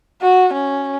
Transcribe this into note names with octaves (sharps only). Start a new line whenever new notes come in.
F#4
C#4